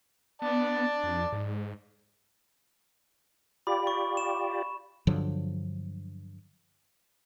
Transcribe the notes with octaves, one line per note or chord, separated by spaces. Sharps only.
B3 D5 A5
F2
G#2
F4 G4 D5 B5
C#6
E7
G2 D3 F3 F#3